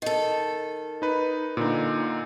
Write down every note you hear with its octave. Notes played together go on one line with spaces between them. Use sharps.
D#3 A4
D#4 B4
A#2 D3 D#4